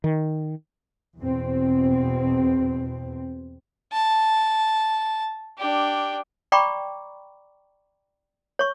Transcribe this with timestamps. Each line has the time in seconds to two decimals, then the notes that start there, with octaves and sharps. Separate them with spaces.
0.04 D#3
1.18 E2 B2 C4
3.92 A5
5.58 D4 G4
6.52 D5 G5 A#5 B5 C#6 D6
8.59 C#5 C#6